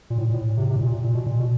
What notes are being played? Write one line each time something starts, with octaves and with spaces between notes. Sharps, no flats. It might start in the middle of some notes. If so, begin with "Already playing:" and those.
A#2
A2
A#2
A2
C3
C3
A2
A#2
A#2
B2
A#2
B2